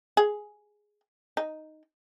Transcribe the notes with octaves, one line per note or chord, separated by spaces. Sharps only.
G#4
D#4